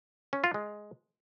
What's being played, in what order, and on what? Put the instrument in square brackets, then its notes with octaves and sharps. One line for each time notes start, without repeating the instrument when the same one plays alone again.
[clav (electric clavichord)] C#4
F4
G#3